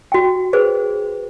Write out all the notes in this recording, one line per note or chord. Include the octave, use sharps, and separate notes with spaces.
F#4 G5
G#4 B4 C5